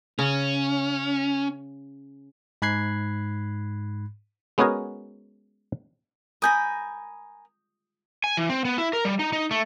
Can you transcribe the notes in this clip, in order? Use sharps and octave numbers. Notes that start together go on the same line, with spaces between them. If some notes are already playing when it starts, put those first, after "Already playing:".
C#3 C#4
G#2 B5 F#6 G#6 C7
G#3 B3 C#4 F#4 G#4 A#4
A#4 G#5 B5 D#6 G6 A#6
G#5
E3
C4
B3
E4
A#4
G3
D#4
D#4
A3